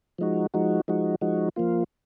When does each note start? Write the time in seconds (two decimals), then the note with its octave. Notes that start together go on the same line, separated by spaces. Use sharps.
0.18 F3 G#3 D#4 F#4
0.54 F3 G#3 D#4 F#4
0.88 F3 G#3 D#4 F#4
1.21 F3 G#3 D#4 F#4
1.56 F3 A#3 F4